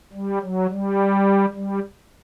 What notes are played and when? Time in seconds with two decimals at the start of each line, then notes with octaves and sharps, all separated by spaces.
0.13 G3
0.41 F#3
0.69 G3
1.54 G3